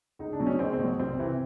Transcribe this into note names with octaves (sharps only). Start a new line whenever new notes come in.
C#2 D#4
D4
B2 F#3
C#4
C#2 C4
C4
B2 F#3
C2 C4
C3 E3